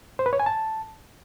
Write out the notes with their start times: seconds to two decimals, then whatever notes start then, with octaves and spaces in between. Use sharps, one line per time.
0.19 C5
0.26 B4
0.33 C#5
0.40 G#5
0.46 A5